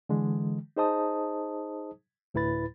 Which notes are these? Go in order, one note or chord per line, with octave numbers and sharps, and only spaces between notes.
D3 E3 G#3
D#4 G#4 C5 D#5 A5 D#6
D2 A2 E4 B4 B5 A6